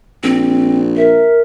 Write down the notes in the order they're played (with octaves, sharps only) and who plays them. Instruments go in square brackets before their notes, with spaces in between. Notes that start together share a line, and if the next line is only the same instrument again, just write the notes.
[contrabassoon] A#1 [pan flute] C4
[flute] A#4 [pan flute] E5